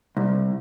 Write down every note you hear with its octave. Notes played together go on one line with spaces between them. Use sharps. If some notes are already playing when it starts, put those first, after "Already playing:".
C2